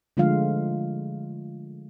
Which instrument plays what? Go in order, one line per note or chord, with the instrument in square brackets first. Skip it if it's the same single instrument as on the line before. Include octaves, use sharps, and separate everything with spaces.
[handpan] D3 F3 G#3 A3 F4 F5